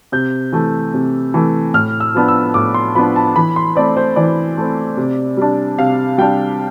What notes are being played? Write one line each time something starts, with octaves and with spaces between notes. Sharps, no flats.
C3 G6
E3 A3
C3
E3 A3
A2 F6
E6
F3 B3 D4
E6
A2 D6
C6
F3 B3 D4 B5
A5
E3 B5
C6
A3 C4 D5
C5
E3 D5
A3 C4
C3
G3 D4
C3 F5
G3 D4 G5